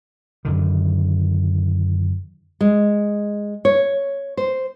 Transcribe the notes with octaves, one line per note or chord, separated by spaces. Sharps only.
F#2 D3 D#3
G#3
C#5
C5